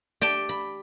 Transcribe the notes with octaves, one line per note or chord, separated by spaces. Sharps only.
G4 D5 G5 A5
B5